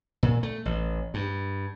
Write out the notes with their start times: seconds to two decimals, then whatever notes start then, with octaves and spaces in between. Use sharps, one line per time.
0.23 A#2
0.43 A3
0.65 A1
1.14 G2